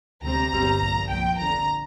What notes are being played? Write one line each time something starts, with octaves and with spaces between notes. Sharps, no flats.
D2 C3 G3 C4 A#5
G1 G2 G3 C4
A#1 A#2 F3
C2 A#2 F3 G5
G1 F2 D3 A#5